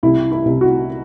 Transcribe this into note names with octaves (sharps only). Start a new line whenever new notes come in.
C2 E4
E4
C2
F#4